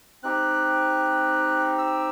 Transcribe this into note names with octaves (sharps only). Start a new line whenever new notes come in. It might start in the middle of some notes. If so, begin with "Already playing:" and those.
C4 D#4 G4 F#6
E6